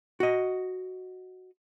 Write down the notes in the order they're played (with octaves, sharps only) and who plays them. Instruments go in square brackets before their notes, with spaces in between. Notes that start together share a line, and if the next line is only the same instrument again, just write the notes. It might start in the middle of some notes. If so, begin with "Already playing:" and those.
[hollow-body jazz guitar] F#4 D#5